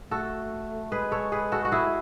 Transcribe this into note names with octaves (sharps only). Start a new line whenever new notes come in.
A3 F#4 A4
G#3 G#4 B4
A4 C#5
G#4 B4
F#4 A4
F#4
E4 G#4